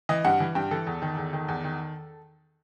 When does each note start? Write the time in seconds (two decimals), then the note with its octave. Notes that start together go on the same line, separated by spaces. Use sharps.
0.09 E3 D#5
0.25 G2 F#5
0.40 E3
0.55 G2 G5
0.71 E3 A4
0.87 E2
1.02 D#3
1.17 E2
1.33 D#3
1.48 E2
1.64 D#3